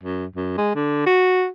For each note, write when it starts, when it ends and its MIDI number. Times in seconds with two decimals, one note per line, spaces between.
0.03 0.25 42
0.35 0.55 42
0.58 0.72 56
0.75 1.03 50
1.06 1.47 66